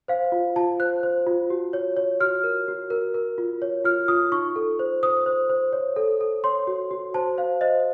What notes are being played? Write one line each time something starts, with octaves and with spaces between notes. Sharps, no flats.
C5 F5
F4
F4 A5
C5 F#6
C5
F4
F#4
C#5
C#5
F#4 F6
A#4
F#4
A#4
A#4
F4
C#5
F4 F6
F4 D#6
D#4 C#6
A4
C5
C5 D#6
C5
C5
C#5
A4
A4
C#5 C6
F#4
F#4
C5 A5
C5 F5
C5 D#5